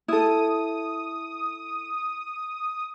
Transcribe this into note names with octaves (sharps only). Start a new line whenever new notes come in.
E4 A4 D#6